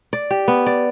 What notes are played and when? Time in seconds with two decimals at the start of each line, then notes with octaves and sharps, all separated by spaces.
0.13 D5
0.31 G4
0.48 B3
0.67 D5